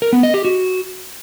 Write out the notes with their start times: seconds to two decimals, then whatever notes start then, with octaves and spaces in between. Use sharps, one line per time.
0.02 A#4
0.13 B3
0.23 D#5
0.34 G4
0.45 F#4